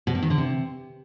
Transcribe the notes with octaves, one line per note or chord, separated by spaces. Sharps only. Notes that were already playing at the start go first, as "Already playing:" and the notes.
B2
G2
D#3
D3
C3